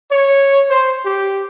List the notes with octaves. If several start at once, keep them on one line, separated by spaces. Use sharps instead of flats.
C#5
C5
G4